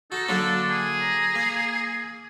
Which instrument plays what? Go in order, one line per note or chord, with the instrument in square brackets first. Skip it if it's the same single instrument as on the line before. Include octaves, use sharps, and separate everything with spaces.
[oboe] D#4 [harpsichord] F#4 [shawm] A4
[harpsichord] D3 F#3 A#3 [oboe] D4
[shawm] G#4
[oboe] A#5
[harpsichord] A#3